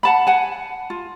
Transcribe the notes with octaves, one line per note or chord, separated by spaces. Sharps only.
F#5 A5 B5
F#5 G#5
F4